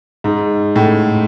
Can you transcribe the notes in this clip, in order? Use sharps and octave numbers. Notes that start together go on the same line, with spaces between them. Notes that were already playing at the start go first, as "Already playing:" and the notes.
G#2
A2